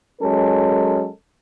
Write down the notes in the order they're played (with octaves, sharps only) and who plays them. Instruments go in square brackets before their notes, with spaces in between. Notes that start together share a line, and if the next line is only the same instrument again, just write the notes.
[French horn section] F#3 G#3 C#4 A4 A#4